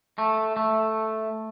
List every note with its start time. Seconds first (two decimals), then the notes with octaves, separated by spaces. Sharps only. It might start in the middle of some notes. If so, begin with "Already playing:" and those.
0.18 A3
0.57 A3